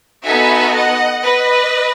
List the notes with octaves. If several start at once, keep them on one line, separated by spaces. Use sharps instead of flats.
B3 D#4 F#4 A4 E5 G#5
D#5 F#5
B4 D#5